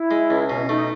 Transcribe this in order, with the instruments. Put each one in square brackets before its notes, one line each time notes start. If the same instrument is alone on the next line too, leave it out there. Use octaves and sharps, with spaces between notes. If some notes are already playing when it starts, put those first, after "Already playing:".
Already playing: [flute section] E4
[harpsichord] G#3
C#2
[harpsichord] B2 [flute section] C#4
[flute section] C#4
[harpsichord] A3 [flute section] D#4